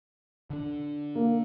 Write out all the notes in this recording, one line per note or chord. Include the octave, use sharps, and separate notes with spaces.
D3 D4
A#3